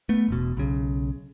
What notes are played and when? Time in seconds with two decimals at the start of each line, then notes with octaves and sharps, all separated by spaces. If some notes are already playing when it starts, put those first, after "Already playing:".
0.09 A3 B3
0.28 E1 B2
0.57 B1 C#3